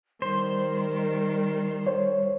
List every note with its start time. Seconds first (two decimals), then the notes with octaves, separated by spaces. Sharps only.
0.22 D#3 G3 C5
1.87 C5 C#5